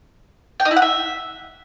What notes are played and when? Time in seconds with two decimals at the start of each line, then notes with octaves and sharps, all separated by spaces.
0.60 G5
0.65 D#4
0.71 E4
0.76 F#5
0.82 E5